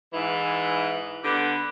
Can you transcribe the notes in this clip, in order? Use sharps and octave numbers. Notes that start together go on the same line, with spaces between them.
G#2 E3
D3 B3 G4